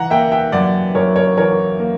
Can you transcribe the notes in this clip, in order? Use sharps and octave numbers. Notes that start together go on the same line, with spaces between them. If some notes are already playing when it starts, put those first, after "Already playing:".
Already playing: E3 F#5 A#5
A#3 E5 G5
E5 G5
F#2 D5 F#5
F#2 A#4 C#5
A#4 C#5
E3 A#4 C#5
A#3